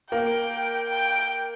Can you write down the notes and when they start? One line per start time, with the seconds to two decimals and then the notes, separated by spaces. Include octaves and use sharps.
0.11 A#3 G5
0.88 G5